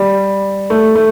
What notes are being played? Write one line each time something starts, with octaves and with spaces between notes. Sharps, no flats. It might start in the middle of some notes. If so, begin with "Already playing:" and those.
Already playing: G3
A3
A3